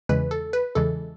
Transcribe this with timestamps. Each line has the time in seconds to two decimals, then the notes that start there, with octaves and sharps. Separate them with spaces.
0.09 E2 C#3 E3 G#3 B4
0.31 A4
0.53 B4
0.75 E2 C#3 E3 G#3 A4